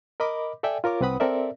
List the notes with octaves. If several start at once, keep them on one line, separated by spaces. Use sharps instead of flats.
A#4 D#5 B5 D6
A4 D5 E5 G5 G#5
F4 A#4 C#5 D6
C2 C4 B4 F#5 B5 D#6
C4 A4 A#4 D5 E5